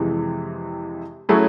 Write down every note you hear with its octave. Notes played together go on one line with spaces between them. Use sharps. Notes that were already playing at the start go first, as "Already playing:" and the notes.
Already playing: F2 C3 E3 G#3
F#3 A3 C#4 E4 G#4